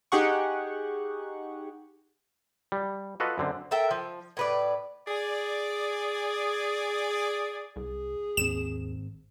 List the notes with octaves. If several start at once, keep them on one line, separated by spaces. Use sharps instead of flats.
D#4 G4 G#4 F#5 C#6
G3
F4 F#4 A4 B4 D#5
F#2 D3 C4
A4 A#4 E5 G5
F3
A2 B4 D5
G#4 D5
C2 G#4
G#1 D#2 C4 E7